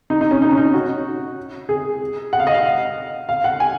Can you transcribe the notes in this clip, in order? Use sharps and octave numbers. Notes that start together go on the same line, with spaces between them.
D#4
D#4
C#4
D#4
C#4
D#4
F#4
G#4
F#5
F5
D#5
F5
F5
F#5
G#5